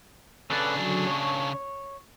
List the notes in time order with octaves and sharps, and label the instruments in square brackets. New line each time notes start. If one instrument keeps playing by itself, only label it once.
[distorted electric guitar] C#3 D4 [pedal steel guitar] A4 B4 D5
[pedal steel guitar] D3 F#3
C#5 C#6